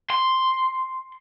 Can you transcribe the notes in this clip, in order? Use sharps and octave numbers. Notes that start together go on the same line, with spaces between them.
C6